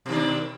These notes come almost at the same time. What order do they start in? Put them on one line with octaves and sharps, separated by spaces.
B2 D#3 D4